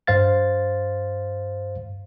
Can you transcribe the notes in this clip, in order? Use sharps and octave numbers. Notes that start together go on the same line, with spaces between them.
G2 C5 F5 A6